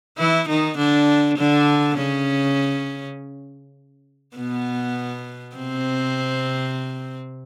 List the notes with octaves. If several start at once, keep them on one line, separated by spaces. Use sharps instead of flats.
E3 E4
D#3 D#4
D3 D4
D3 D4
C#3 C#4
B2 B3
C3 C4